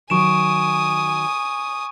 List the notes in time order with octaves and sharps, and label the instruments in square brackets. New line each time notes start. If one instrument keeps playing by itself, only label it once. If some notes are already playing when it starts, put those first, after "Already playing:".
[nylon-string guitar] D#3 F#3 [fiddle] G#5 D#6 [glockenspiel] C#6 D7 E7